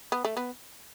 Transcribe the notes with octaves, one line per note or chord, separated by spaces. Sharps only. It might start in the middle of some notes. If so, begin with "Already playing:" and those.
B3
A3
B3